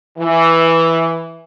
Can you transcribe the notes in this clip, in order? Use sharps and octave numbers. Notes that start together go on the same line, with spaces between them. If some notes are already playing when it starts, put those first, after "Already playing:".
E3